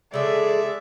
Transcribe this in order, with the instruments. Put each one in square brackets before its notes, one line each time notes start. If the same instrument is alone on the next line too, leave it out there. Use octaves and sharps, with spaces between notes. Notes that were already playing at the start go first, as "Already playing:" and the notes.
[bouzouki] C#3 G#4 C#5 [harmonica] G#3 E5 [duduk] A4 [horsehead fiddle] D5